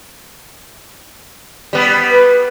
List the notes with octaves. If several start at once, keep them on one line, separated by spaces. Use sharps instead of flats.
G3 B3
B4